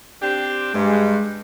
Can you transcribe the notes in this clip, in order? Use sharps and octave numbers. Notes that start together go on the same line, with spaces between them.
C4 D4 G4
G2 G#3